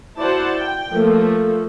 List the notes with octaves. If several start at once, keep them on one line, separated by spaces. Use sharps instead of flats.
E4 F#4 C5 D5 F#5 A5
G5
F3 A3 A#3 A4